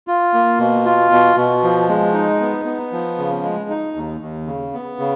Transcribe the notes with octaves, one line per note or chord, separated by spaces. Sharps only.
F4
A#3
B2
F4
B2
B2
F3
G#3
D#4
B3
B3
F3
C#3
G#3
D#4
D#2
D#2
C#3
B3
C#3